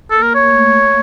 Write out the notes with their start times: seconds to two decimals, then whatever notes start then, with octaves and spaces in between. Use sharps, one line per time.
0.10 A#3 A4
0.23 A#4
0.35 C#5
0.48 A3